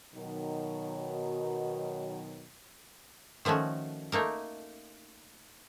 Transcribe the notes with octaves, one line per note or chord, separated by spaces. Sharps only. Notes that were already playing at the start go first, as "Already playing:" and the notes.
B2 D#3 F#3
D#3 F3 A3 C#4 F#4
A3 A#3 D#4 A#4